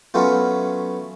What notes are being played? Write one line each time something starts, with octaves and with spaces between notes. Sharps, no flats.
F#3 A3 B3 C#4 F4